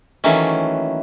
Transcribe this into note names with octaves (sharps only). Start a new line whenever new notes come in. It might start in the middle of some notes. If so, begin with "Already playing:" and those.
D#3 E3 F#3 A3 A#3 C#4